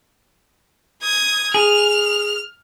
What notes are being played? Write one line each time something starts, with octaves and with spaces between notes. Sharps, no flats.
D#6 G#6
G#4 F6 F7